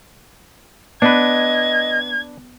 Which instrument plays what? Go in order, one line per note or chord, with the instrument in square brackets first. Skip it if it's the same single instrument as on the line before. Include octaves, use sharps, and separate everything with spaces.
[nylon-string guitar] B3 [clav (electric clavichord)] D4 B4 [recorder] D#5 [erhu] G#6